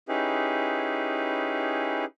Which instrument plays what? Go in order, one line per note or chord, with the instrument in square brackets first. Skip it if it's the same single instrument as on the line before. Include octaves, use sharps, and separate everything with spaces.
[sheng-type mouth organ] C#4 D#4 E4 G4 G#4 B4